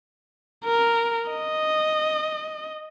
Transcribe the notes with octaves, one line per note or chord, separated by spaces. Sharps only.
A#4
D#5